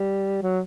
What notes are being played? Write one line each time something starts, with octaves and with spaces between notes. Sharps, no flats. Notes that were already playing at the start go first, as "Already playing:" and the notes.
Already playing: G3
F#3